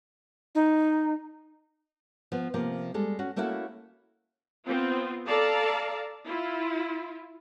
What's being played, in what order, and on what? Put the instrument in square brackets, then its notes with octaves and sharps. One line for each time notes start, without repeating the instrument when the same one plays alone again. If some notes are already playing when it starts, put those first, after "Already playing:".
[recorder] D#4
[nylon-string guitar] F3 B3
C3 F3 A#3
G3 G#3 A4
C#4 F#4
A3 A#3 C#4 E4 F#4 A4
[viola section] B3 C4 F4
A4 D5 F5 A5 A#5
E4 F4